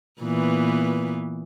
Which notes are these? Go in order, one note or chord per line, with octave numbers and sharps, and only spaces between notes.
A#2 E3 B3